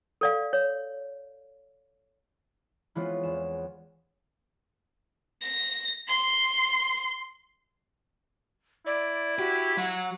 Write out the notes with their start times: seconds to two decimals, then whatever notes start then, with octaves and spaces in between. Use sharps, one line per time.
0.21 A4 D5 F5
0.53 C#5
2.95 E3 G#3 B3 C4 F4 C#5
3.23 E2 E7
5.42 A#6
6.08 C6
8.86 E4 D5
9.39 F#4 G4
9.77 F#3 F#5